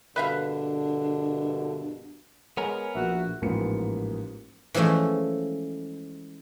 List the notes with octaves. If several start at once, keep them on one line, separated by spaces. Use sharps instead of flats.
A#1 G2 B2 D3 D4 B4 E5 F5
G#3 B3 A#4 C#5 G#5
A#1 F#4 E5
A1 G#2 F3 A#3 B4 C#7
E3 F3 G#3 A3 C#4